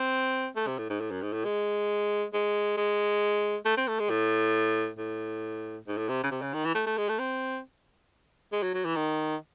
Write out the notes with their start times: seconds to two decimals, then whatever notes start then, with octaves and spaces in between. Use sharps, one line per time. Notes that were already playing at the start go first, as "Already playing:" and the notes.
Already playing: C4
0.56 A3
0.67 C3
0.78 A2
0.90 G#2
1.01 A2
1.11 F#2
1.22 G#2
1.33 A2
1.45 G#3
2.34 G#3
2.77 G#3
3.65 A3
3.77 C4
3.88 A3
4.00 G#3
4.10 A2
4.98 A2
5.88 G#2
5.98 A2
6.09 C3
6.24 C#3
6.31 C3
6.42 C#3
6.54 D#3
6.65 E3
6.75 A3
6.87 A3
6.98 G#3
7.09 A3
7.20 C4
8.52 G#3
8.63 F#3
8.74 F#3
8.85 E3
8.96 D#3